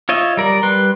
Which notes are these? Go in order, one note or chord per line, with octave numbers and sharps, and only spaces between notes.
F4 C#5 D#5 E5
G3 A#4 D5
G3 B4 C6